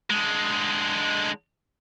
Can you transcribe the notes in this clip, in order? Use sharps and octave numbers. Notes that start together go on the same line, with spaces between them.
D3 G#3